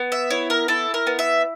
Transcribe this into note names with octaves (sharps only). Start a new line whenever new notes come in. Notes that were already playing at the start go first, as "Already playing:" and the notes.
Already playing: B3
E5
E4 C#5
A#4
E4 A4
A#4
B3
E5